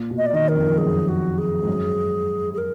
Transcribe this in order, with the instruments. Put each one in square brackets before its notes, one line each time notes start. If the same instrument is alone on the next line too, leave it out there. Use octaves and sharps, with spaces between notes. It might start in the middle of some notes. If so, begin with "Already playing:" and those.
Already playing: [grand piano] A#2
B2
[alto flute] D#5
D5
[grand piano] D#3 [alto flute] D#5
[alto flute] A#4
[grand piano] F2
F2
[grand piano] F#2 [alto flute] G#4
[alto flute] F#4
G#4
[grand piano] G#2
F#2
[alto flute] G#4
A#4